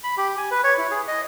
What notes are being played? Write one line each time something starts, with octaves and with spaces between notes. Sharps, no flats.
B5
G4
G#5
B4
C#5
E4
G#4
D#5